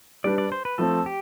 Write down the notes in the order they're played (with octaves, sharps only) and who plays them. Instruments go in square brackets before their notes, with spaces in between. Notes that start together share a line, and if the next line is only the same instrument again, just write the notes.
[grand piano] G3 D4 G4 B4 [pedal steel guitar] D5
[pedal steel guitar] D5
C5
B4
[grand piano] F3 A3 C4 [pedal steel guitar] A4
[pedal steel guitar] G4